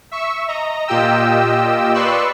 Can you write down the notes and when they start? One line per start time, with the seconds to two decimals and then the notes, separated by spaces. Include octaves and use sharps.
0.11 E5 C#6 E6
0.48 D#5 A#5
0.88 A#2 F4 G4 D#5 G5 E6
1.94 B4 D5 C6 C#6 E6 F#6